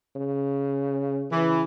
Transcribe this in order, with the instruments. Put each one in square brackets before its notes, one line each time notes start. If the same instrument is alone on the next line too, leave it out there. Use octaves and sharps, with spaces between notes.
[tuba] C#3
[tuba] C#3 [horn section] E3